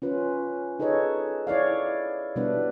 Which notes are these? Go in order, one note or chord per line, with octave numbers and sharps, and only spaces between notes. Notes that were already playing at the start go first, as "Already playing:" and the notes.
C#4 F4 B4
D#4 G#4 A4 B4 C#5 D#5
E4 C#5 D5 F5
B2 G3 B3 D4 E4 B4